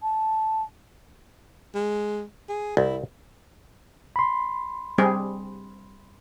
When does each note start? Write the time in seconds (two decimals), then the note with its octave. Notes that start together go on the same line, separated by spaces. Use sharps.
0.03 A5
1.75 G#3
2.49 G#4
2.77 C2 E4
4.16 B5 C6
4.98 G3 C4 G#4